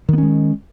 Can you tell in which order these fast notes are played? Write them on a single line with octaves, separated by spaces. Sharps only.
D#3 B3 C#4 G#3